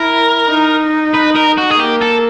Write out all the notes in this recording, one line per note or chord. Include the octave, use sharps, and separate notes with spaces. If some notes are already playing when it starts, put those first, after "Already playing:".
Already playing: E4 A#4
D#4
B4
A#4
F#4
G#4
A#3 G4
A4